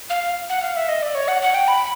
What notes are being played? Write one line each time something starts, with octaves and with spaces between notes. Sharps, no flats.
F5
F#5
F5
E5
D#5
D5
C#5
F#5
F#5
G5
B5